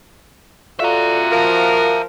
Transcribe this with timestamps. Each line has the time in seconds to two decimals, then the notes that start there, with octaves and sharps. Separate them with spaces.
0.80 F4 F#4 A4 D5 E5 F5 A#5
1.32 F3 A#4 F5